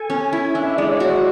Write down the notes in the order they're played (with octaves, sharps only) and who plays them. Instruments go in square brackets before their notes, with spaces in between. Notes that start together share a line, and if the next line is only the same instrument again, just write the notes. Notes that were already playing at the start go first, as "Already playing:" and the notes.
Already playing: [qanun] A4 [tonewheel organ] G#5
[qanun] C#4
E4
[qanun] D4 [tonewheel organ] E5
[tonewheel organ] E5
[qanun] G#3 [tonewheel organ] D5
[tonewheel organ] C#5
[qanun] F#4 [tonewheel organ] D5